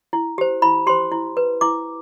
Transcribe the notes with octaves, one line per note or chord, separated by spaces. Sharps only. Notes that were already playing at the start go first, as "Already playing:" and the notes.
E4
G4 C5
E4 B5
G4 C5 C6
E4
B4
E4 D6